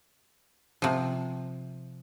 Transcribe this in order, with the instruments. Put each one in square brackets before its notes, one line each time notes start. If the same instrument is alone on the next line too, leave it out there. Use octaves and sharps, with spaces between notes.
[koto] C3 F3